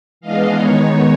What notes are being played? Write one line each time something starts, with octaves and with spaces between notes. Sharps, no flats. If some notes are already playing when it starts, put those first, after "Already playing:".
E3 G#3 B3 D4 D#5 F5
D#3 G#3 B3 D#4 C#5